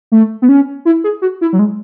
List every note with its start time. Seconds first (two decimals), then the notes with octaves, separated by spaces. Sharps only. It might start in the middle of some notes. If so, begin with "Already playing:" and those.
0.12 A3
0.42 B3
0.49 C#4
0.85 E4
1.04 G#4
1.22 F#4
1.41 E4
1.53 F#3
1.59 G#3